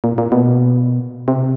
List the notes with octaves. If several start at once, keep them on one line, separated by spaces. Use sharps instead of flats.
A#2
A#2
B2
C3